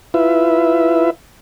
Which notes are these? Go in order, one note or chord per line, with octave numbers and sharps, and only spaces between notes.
E4 F4 B4 E5